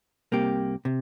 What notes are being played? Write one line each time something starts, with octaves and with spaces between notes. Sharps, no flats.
C2 C3 A#3 G4
C3